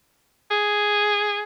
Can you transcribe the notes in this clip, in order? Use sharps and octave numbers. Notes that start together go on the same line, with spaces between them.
G#4